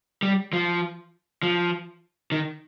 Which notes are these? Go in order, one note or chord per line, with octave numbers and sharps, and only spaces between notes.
G3
F3
F3
D#3